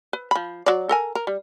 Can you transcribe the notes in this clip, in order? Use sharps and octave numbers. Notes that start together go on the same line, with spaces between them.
B4
F3 B5
F#3 D5
A4 A#4 G#5
A#4
G3